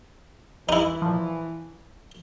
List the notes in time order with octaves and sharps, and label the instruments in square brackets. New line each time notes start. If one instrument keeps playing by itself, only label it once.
[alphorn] E3 [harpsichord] D#4 E4
[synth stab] A#2 F3